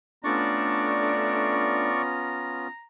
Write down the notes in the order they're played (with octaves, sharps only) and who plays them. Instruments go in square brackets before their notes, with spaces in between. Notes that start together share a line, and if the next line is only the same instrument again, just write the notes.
[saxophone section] A3 D4 [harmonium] B3 C#4 F4 [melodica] D5 C#6 [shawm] A#5